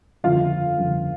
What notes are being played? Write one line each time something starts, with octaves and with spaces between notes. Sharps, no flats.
G1 F2 C#3 F4 F5
G1 F2 C#3